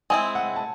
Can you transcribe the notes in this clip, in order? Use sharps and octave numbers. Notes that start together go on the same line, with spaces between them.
G#3 C4 E4 G#5
F#5
A5